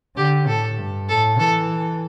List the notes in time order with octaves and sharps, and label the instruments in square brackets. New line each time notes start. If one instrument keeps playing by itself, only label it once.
[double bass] D3 [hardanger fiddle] G4
[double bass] A2 [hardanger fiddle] A4
[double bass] G2
[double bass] A2 [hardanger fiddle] A4
[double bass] E3 [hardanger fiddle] A4